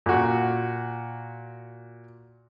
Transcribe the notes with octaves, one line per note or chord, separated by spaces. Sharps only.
A#2 F#4